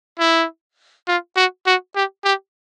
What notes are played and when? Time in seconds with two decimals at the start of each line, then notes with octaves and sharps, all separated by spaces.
0.19 E4
1.07 F4
1.36 F#4
1.66 F#4
1.95 G4
2.24 G4